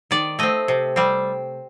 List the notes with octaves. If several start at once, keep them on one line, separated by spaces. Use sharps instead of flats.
D#3 D5
A3 C4 D#5
C3
G3 C4